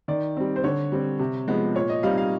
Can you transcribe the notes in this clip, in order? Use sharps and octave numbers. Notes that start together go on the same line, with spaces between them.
D#3 D5
G3 C4
C5
D3 C#5
G3 C4
C3
F3 G#3 B3
A#2 C#5
D#5
G3 C4 D#4 F5
F5